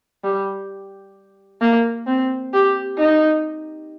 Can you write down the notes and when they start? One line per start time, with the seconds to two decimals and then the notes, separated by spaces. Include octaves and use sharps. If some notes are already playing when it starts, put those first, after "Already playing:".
0.24 G3
1.61 A#3
2.07 C4
2.54 G4
2.98 D#4